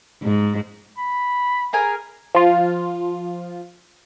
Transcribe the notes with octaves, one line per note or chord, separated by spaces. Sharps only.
G#2
B5
G#4 A#4 G#5
F3 F4